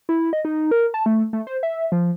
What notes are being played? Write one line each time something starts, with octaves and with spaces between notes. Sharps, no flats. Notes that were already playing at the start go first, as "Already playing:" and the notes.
E4
D#5
D#4
A#4
A5
A3
A3
C5
E5
F3